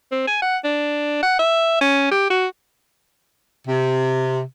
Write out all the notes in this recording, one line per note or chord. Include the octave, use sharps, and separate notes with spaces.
C4
G#5
F#5
D4
F#5
E5
C#4
G4
F#4
C3